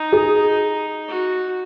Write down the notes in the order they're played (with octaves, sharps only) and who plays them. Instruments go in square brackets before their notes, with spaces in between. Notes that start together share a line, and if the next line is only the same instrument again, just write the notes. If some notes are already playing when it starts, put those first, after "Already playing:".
Already playing: [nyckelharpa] D#4
[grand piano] G#4
[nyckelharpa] F#4